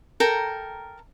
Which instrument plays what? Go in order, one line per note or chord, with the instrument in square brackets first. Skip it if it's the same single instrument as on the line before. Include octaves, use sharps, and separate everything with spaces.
[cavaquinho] A4 A#4 G5 A#5